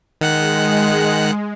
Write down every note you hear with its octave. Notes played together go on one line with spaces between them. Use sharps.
D#3 G#3 F#5 F#6